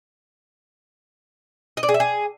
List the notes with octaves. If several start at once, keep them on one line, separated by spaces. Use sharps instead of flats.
D#5
D5
G#4
E5
G#4